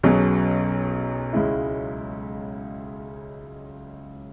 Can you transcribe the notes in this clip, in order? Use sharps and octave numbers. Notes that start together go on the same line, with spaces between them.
B1 B2 F#3 C#4 G#4
C#2 C#3 G#3 C#4 E4